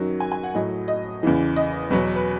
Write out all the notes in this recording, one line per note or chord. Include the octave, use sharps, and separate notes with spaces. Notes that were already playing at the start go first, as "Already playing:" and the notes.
Already playing: F#2 D#3 F#3
G#5
G#5
F#5
A2 F#3 D#5
D#5
E2 C#3 E3
D#5
E2 B2 F#3 B4
B4